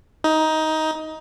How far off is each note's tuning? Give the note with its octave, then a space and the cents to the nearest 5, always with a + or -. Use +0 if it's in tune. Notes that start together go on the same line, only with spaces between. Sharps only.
D#4 +15